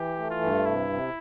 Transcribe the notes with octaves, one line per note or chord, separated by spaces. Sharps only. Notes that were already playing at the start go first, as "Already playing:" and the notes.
Already playing: E3 G4
A3
F4
G2
C3 E4
C3